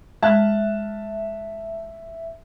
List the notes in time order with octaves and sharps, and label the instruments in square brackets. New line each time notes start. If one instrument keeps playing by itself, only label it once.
[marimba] G#3 [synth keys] E5 [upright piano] A5 F6 F#6